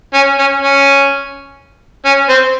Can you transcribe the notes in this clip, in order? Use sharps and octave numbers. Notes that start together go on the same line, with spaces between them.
C#4
C#4
C#4
C#4
C4